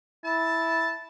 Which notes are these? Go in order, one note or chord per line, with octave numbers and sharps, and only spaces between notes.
E4 A5